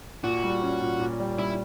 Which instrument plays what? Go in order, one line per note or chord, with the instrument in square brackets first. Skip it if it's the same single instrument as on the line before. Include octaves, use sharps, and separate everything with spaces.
[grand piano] A#2 [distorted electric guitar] F#4
[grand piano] G3
C#4
A#2
A#2
G3
[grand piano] G3 [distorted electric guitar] E4